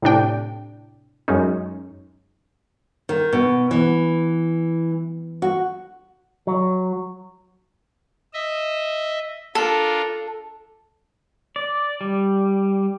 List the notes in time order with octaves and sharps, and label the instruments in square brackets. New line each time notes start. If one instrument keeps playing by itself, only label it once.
[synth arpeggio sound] A2 C3 D4 G5
F#2 G#3 C#4 D#4
[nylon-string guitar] D#3
B2
E3
F#4
[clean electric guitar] F#3
[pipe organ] D#5 E5
[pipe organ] D4 F4 A#4 [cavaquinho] A4
[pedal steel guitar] D5
G3